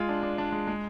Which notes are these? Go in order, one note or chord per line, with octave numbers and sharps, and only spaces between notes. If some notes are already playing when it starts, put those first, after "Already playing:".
Already playing: G#3 F4
D4
D4
D4
G#3
G#3